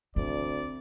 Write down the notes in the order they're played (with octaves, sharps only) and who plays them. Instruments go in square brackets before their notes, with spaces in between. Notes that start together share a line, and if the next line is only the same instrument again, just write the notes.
[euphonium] D2 [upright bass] C4 [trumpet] D5